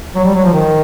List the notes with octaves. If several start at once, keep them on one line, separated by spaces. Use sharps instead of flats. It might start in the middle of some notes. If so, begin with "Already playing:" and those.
F#3
G3
F#3
F3
D#3